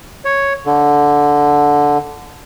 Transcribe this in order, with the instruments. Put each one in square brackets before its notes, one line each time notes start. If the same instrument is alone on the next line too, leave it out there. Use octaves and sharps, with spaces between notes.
[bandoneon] C#5
D3